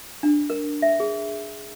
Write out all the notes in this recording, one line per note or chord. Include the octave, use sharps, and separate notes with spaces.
D4
A#4
E5
G#4